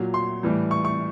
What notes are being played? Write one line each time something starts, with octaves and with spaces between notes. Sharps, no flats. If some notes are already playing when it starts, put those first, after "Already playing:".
Already playing: A#2 F#3
C6
A2 E3 G3
C#6
C#6